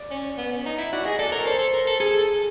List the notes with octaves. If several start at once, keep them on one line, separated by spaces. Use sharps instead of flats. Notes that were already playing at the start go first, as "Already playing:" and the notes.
Already playing: D5
C#4
B3
C#4
D#4
E4
F#4 D5
G#4 D#5
A4 D5
A#4 C#5
A4 C5
A4
A#4
A4
G#4 A4
A4